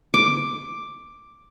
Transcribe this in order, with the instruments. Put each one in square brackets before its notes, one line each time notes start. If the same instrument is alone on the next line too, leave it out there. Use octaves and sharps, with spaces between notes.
[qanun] D6